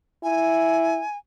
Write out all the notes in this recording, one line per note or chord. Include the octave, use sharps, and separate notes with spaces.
E4 G#5